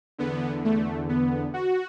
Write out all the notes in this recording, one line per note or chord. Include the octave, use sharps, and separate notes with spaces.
E2 D3 B3
A3
B3
F#4